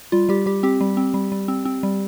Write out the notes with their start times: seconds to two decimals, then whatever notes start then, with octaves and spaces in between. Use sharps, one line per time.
0.12 G3 F4
0.29 G3 G4
0.46 G3 G4
0.63 C4 G4
0.81 G3
0.97 C4
1.14 G3
1.32 G3
1.48 C4
1.65 C4
1.83 G3